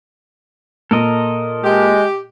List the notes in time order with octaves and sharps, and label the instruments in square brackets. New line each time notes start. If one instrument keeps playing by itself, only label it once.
[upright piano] A#2 [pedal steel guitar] A4 A#4 D#5
[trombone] G#3 [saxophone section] G4